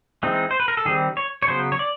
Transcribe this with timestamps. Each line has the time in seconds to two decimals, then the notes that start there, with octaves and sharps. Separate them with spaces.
0.23 E3 G#3 C4 D#4
0.51 C5
0.60 B4
0.68 A#4
0.77 A4
0.85 D#3 G3 C4 G#4
1.17 C#5
1.43 C#5
1.47 C#3 F#3 B3 C5
1.72 C#5
1.79 D5